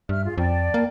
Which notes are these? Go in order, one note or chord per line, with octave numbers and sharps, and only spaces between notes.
G2 E5 F6
F4 G#4
F2 D5 G5 A5
A#3